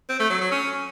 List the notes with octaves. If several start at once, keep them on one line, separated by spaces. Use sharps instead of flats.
C4
A3
F#3
F#3
C#4